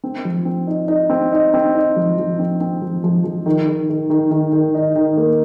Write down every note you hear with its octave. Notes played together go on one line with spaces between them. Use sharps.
C4
F3
C4
D#4
D#4
C4
D#4
C4
D#4
F3
F3
C4
C4
F3
F3
F3
D#3
D#3
D#3
D#3
D#3
D#3
D#4
D#3
A#3